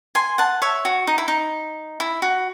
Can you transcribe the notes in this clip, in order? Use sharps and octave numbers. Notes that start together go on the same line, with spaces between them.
G#5 C6
F#5 A5
C#5 E5
F#4
D#4
E4
D#4
E4
F#4